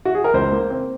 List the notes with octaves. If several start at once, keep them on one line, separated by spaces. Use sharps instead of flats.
F#4
G#4
A#4
C#2 C5
A#3
C4